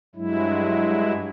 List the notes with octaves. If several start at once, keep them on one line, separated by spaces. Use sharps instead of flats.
G2 F#3 G#3 E4